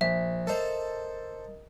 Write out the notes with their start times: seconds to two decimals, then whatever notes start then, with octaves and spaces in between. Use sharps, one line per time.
0.01 A#1 E5
0.47 A4 A#4 C5 D#5